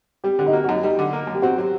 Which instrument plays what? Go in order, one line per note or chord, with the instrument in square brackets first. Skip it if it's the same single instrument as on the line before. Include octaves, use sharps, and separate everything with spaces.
[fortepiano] G3 [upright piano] G4
[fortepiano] D3 [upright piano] G4
[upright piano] D#4
[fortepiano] A#3 [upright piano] F#4
[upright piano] F#4
[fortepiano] F#2 [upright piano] D#4
[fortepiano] G3 [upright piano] D#4
[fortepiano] D3
A#3
F#2
[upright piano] G4
[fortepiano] C4 [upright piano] F#4
[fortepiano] F#3 [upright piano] G4